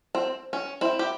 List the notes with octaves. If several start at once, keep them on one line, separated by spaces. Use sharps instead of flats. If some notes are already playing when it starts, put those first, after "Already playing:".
C4
C#4
C4 E4
G4